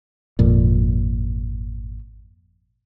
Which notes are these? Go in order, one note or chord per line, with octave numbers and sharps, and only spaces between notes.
G#1 F2 A#2